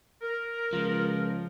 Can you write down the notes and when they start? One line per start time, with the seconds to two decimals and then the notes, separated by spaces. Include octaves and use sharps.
0.22 A#4
0.73 C#2 F3